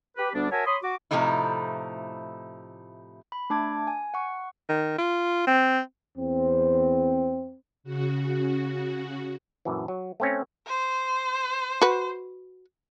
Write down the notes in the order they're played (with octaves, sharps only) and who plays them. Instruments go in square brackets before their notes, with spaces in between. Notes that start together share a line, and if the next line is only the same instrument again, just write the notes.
[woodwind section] G4 B4
D2 G3 B3 D4
F#4 A#4 C#5 E5 G#5 A5
C#5 B5 C6 D#6
F#4 D6
[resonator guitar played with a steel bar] A2 C3 F3 A3 D#4 E4
[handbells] B5
A3 D4 A5 D6 G#6
G#5
F#5 C#6
[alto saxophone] D#3
F4
C4
[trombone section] E2 C4
[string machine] C#3 F#4
[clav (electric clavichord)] A#1 F#2 E3
F#3
A3 C4 C#4
[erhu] C5
[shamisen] F#4 B4